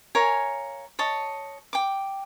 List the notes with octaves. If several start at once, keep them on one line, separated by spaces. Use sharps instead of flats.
A#4 C#5 F5 G#5
C#5 D#5 A5
G5 D6